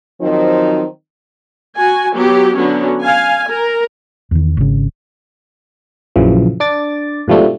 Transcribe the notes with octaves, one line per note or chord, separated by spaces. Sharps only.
D#3 F3 F#3 C4 D#4
F#4 G#5
F#3 B3 G4
D3 F#3 B3 C#4
F5 G#5
A#4
E2 D#3
G#1 C#3
A#1 F#2 C#3 E3 F3
D4 D6 A6
G#2 B2 F3 G3 A3 D4